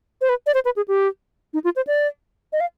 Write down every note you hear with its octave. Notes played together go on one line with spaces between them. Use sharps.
C5
B4
D5
C5
B4
G#4
G4
D#4
F4
C5
D5
D#5
F5